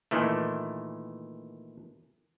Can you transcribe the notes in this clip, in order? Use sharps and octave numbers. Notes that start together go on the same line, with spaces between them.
A#2 D#3 E3 A3